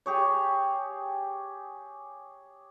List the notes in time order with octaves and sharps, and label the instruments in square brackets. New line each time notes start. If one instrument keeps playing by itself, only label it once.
[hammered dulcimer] G4 G#4 C#5